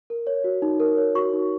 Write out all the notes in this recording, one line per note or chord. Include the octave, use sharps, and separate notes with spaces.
A#4
C#5
F#4
D#4
A#4
C#5
F#4 C#6
D#4